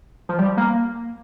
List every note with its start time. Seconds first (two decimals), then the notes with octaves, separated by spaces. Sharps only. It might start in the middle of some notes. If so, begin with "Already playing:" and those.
0.29 F3
0.39 G3
0.57 A#3